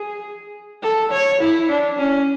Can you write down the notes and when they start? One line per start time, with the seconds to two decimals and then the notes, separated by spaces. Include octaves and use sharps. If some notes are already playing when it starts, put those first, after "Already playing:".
Already playing: G#4
0.82 A4
1.11 C#5
1.40 E4
1.69 D4
1.98 C#4